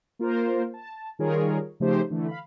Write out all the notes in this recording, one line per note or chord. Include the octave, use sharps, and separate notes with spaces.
A#3 F4 A#4 C5
A5
D#3 G3 F4 G#4 A#4 C#5
C#3 F3 A3 D#4 G4 C5
D3 E3 A3
F5 B5